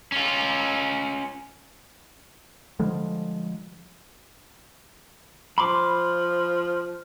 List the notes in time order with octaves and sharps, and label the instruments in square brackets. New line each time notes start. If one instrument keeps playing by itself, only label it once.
[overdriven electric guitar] C#4 F4
[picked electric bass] D3 F3 G3 G#3
[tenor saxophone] F3 [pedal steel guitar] B5 C6 D6